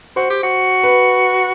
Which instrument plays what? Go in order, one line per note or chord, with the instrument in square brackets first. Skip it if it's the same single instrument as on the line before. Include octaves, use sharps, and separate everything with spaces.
[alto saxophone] F#4 [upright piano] C5
[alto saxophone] G4
F#4
[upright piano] B4